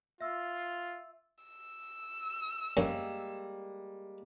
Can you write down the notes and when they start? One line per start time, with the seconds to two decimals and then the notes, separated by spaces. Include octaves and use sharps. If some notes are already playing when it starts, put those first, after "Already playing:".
0.21 F4 E5 E6
1.44 E6
2.77 F#2 G3 G#3 A#3